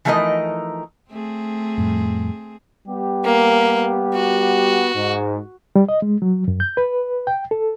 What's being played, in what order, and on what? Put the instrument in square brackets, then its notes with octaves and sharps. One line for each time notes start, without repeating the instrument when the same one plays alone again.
[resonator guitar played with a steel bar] E3 F3 A3 D#4 A#4 D#5
[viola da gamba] A3 C4 G#4
[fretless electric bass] F2 A2 G3
[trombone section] G3 B3 G4
[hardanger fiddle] A#3
F#4
[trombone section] G#2
[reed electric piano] G3
D#5
G#3
F#3
F#2
G6
B4
G5
A4